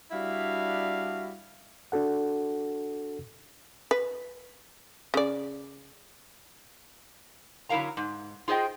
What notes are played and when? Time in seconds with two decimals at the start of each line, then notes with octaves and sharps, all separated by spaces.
0.12 G3 D4 E4 F#4 F5
1.92 D4 F#4 A4 F#5
3.91 B4
5.14 C#3 D5
7.69 D3 F#3 E4 A#4 F5 A#5
7.97 G#2
8.48 F4 G#4 C5 D#5 G5